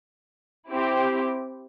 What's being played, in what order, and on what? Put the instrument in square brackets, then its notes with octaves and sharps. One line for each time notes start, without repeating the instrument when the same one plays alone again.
[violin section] C4 E4 G4